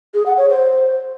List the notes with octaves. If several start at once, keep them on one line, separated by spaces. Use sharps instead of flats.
G#4
F#5
C#5
C5